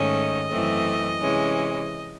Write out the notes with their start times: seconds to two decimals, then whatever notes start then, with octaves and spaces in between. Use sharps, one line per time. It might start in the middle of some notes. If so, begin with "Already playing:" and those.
Already playing: G#2 D#3 A3 C#4 D#5
0.50 F#2 E3 A3 C4
1.20 C3 E3 G#3 C#4